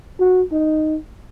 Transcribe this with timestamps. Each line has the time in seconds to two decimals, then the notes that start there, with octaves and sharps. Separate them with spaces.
0.20 F#4
0.52 D#4